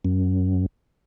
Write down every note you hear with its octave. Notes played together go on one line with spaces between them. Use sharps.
F#2